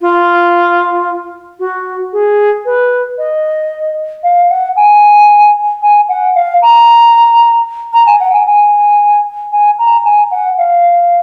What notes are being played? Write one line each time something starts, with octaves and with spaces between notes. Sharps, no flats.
F4
F#4
G#4
B4
D#5
F5
F#5
G#5
G#5
F#5
F5
A#5
A#5
G#5
F#5
G#5
G#5
G#5
A#5
G#5
F#5
F5